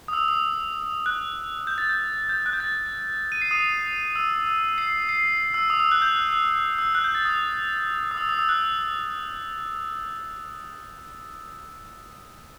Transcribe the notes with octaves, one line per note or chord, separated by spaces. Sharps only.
D#6
E6
D#6
F#6
G6
A6
G6
G6
F#6
G6
A6
D#7
C7
D#6 D#7
E6
E6
C7
C7
E6
D#6
E6
F#6
G6
F#6
E6
E6
F#6
G6
A6
D#6
D#6
E6
D#6
E6
F#6